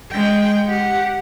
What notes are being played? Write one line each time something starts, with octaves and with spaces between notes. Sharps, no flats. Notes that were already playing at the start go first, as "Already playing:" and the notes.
G#3 G5
G4 F#5